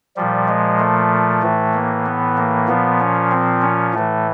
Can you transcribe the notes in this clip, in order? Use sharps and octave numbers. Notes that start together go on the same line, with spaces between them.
A#2 F3 G3
G#3
A3
A2 E3
A#3
B3
A#3
A#2 F3 B3
C#4
C4
C#4
A2 E3 A3